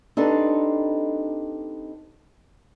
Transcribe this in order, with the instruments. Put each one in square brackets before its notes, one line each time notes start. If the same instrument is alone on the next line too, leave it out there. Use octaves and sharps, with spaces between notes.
[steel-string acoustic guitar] C4 D4 D#4 G4 A4 B4